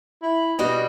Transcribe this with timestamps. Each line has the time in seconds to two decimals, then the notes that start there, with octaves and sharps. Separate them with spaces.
0.22 E4
0.59 B2 G3 F#4 D#5